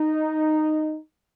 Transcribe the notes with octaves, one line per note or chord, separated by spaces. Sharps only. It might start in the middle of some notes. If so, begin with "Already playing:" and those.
Already playing: D#4